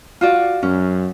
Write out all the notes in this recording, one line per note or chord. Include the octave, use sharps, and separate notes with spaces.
F4 F#4 D5
F#2 C#4